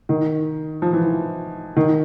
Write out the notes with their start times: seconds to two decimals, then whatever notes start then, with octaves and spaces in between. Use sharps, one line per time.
0.09 D#3
0.82 F3
0.93 E3
1.77 D#3